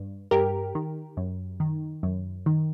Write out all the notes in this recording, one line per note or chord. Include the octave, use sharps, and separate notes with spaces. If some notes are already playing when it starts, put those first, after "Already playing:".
Already playing: G2
G2 G4 A#4
D#3
F#2
D#3
F#2
D#3